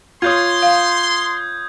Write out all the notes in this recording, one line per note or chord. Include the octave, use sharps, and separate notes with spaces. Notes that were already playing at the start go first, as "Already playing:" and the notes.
F4 C#5 C6 D#6 G6 G#6
F5